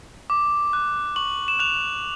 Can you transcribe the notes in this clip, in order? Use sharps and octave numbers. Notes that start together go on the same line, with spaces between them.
D6
F#6
C#6 F#7
E7
F#6 F7